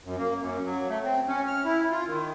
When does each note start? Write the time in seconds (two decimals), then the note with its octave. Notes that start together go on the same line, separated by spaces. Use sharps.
0.05 F#2
0.18 A#3
0.41 F#2
0.66 F#3
0.89 A3
1.04 C4
1.28 C#4
1.48 F6
1.65 E4
1.91 F4
2.07 D#3